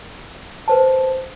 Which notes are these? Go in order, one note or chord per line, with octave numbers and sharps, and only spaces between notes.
B4 C5 A5